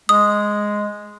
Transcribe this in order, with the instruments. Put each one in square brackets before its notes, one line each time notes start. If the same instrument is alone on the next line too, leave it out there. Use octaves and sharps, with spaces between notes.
[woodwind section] G#3 [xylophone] D#6